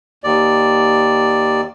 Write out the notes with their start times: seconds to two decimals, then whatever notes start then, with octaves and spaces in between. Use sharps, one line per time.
0.24 D#2 D5